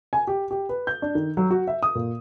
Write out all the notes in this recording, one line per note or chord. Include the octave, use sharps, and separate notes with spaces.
G#5
G4
G4
B4
G6
D4
D#3
F#3
F#4
E5
D#6
A#2